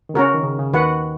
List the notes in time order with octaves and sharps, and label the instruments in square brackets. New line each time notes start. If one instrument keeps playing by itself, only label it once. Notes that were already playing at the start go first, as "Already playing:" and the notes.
[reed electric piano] D#3
[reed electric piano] C#3 [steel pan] C#4 F#4 A#4
[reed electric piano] D#3
C#3
C#3
[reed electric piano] D#2 D#3 [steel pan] F#4 B4 F#5